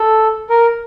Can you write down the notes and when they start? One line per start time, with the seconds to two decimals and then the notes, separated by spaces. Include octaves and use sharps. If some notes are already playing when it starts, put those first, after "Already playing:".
Already playing: A4
0.50 A#4